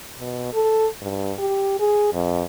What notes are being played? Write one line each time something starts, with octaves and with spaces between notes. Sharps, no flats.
B2
A4
G2
G4
G#4
F2